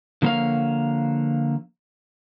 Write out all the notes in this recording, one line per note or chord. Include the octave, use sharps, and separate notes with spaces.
D3 F3 A#3 C5 C#5 F5